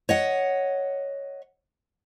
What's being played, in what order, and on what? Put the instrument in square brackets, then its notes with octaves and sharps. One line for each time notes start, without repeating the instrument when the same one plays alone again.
[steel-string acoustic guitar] C#5 D#5 F#5